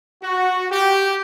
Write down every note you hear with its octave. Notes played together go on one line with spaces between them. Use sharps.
F#4
G4